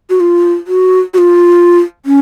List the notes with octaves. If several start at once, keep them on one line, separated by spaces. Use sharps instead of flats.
F#4
F4
F#4
F#4
F4
C#4